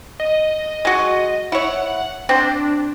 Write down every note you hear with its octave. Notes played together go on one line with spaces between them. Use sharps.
D#5
G#3 F#4
E4 C#5 F#5
C4 D4 C5